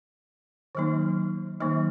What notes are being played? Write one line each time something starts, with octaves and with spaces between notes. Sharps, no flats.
D#3 F#3 A#3 D#4
D#3 F#3 A#3 D#4